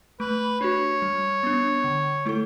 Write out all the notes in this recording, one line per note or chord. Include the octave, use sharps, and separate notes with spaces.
A3 B4
D4 F#4 C#5
G3
B3 D4
D3
A3 E4 A4